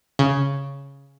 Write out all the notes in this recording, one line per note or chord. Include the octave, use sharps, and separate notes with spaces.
C#3